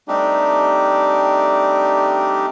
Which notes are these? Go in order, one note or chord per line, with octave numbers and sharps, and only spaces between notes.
G3 A3 C4 D4 D#4 G4